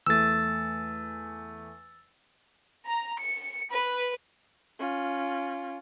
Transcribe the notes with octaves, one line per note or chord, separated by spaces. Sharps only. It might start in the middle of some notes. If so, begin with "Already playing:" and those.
E2 A3 E6 A6
A#5
C#7
B4
C#4 F4